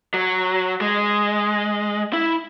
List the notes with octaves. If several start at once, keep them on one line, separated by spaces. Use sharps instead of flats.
F#3
G#3
E4